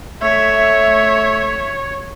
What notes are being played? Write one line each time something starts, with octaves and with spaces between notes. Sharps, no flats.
A3 C#5 E5